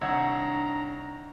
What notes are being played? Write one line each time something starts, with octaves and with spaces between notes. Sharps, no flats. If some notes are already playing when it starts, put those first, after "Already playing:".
C2 D#3 D4 C#5 F#5 A#5 E6 G#6